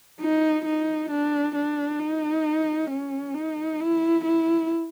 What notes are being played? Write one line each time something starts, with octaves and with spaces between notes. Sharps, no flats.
D#4
D#4
D4
D4
D#4
C#4
D#4
E4
E4